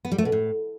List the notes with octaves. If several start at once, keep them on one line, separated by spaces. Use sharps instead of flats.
B3
G3
A3
B2
A2